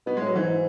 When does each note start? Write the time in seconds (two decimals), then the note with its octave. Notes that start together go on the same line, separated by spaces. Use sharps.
0.06 B2 B3
0.17 A2 G#3
0.27 F#3
0.36 G#2 E3